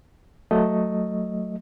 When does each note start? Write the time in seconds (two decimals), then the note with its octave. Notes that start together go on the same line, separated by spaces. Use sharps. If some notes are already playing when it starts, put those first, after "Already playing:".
0.51 F#3 A3 D#5